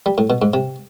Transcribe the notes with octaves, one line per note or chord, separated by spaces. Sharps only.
G3
A2
B2
G#2
C3